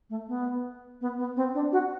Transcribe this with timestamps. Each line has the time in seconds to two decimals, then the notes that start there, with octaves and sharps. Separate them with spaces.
0.10 A3
0.28 B3
1.01 B3
1.19 B3
1.36 C4
1.54 D4
1.72 F#4